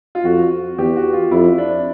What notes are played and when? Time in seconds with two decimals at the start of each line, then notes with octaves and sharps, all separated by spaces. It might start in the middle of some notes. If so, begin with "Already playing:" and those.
0.15 F4
0.25 F2 F#4
0.78 E2 G4
0.96 F#4
1.13 F4
1.31 F2 E4
1.58 D4